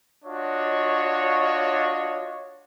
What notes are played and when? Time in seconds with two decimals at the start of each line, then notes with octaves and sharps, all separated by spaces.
0.25 D4 F4 F#4 C#5 D#5